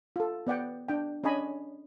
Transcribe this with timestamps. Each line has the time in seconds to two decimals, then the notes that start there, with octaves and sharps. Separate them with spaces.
0.16 F4 A4
0.47 B3 D5 F#5 G5
0.88 D4 G5
1.24 C#4 D4 C#5 D#5 G#5 B5